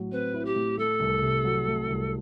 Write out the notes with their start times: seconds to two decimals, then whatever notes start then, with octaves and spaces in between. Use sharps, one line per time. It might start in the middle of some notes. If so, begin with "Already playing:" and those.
Already playing: A2 F#3
0.12 C4 B4
0.34 E4
0.45 G4
0.56 A2
0.78 A3 A4
1.00 C2
1.22 C3
1.44 F#3
1.67 A3
1.88 C2